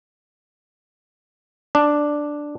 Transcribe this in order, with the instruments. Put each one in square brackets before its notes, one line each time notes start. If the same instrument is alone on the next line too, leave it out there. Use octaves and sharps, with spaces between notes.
[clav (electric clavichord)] D4